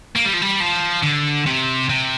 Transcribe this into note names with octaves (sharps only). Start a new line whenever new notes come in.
A#3
G3
F3
G3
F3
D3
C3
C3